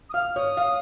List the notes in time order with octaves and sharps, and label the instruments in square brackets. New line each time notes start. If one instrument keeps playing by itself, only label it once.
[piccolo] D#6
[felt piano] F5 [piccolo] F6
[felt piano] C#5 [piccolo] D#6
[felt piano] F5